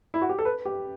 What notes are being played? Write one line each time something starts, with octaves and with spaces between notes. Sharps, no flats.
E4
F#4
G4
A4
B4
G4